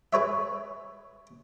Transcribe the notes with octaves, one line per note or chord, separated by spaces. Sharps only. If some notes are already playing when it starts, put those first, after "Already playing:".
G#4 B4 C#5 E5